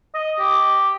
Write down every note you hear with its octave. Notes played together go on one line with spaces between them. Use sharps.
D#5
G4